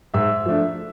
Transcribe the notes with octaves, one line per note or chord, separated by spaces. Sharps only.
G#2 E5 E6
F3 A3 D4